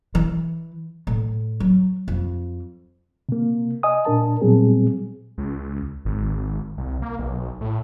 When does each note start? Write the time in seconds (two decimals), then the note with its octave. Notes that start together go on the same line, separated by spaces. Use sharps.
0.15 E3
1.07 A2
1.60 F#3
2.08 F2
3.29 C3 A#3
3.83 D#5 G#5 D#6
4.05 A#2 D4 A#4 A5
4.41 A#2 F#3 G3 B3 C4 G#4
5.38 C#2
6.05 G#1
6.77 C2
7.02 A#3
7.19 B1
7.61 A2